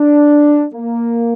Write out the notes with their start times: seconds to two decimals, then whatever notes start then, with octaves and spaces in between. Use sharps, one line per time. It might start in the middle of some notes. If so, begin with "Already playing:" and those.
Already playing: D4
0.74 A#3